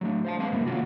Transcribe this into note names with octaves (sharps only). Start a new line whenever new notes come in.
F#3 A3 D4
C5 F5 A5
G#3 B3 C4 F5
G2 C3 F#3 A#3 E4
C3 D#3 A#3 C#4 F4 F#4